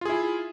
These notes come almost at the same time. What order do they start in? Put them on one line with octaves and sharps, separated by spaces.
F4 G#4 E4